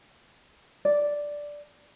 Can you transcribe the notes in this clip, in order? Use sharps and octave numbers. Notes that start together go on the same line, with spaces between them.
D5